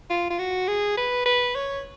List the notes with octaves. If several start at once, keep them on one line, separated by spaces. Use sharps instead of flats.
F4
F4
F#4
G#4
B4
B4
C#5